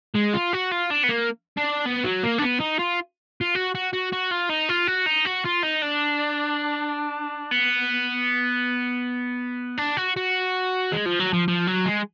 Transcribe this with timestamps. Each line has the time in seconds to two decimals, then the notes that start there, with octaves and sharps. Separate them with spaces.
0.15 G#3
0.34 F4
0.53 F#4
0.72 F4
0.91 D4
1.04 B3
1.09 A#3
1.57 D4
1.85 B3
2.04 F#3
2.23 A#3
2.38 D4
2.42 B3
2.60 D#4
2.79 F4
3.41 F4
3.55 F#4
3.75 F#4
3.93 F#4
4.12 F#4
4.31 F4
4.49 D#4
4.69 F4
4.87 F#4
5.06 D#4
5.25 F#4
5.45 F4
5.63 D#4
5.82 D4
7.51 B3
9.77 D4
9.97 F#4
10.16 F#4
10.92 G#3
11.06 F3
11.19 F#3
11.33 F3
11.48 F3
11.67 F#3
11.85 G#3